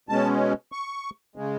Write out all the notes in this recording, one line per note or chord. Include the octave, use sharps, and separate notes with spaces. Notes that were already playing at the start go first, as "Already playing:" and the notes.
B2 G#3 C#4 A5
C#6
C#3 G#3